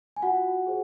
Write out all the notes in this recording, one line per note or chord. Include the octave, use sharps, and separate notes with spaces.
G#5
F4 F#4 F#5
G#4 C5